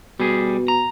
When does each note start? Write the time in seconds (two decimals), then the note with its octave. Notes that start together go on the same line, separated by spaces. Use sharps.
0.20 B2 G3 G#4
0.68 A#5